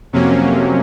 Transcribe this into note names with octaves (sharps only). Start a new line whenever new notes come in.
F2 C3 F#3 A#3 C#4